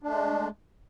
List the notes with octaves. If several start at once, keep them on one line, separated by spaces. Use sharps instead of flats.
G#3 A3 D4